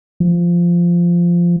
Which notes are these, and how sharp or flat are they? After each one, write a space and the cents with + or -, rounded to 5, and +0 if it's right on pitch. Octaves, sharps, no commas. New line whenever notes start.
F3 -10